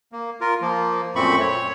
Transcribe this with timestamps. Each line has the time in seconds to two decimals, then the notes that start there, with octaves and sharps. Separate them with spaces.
0.12 A#3
0.41 F4 A#4
0.62 F3 A#3
1.16 F#2 A#2 A3 C4 B5 C#6
1.40 C#5